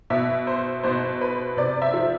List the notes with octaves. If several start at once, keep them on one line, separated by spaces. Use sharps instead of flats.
B2 E5
C5
B2 C5
B4
C3 D5
E5
F3